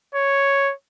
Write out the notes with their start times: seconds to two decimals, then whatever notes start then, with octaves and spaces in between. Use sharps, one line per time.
0.15 C#5